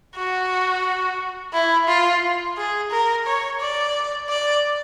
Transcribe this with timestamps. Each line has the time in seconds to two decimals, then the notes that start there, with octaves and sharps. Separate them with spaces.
0.16 F#4
1.53 E4
1.88 F4
2.57 G#4
2.91 A#4
3.26 C#5
3.61 D5
4.29 D5